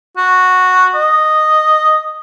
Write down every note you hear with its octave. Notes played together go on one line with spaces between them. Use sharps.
F#4
D#5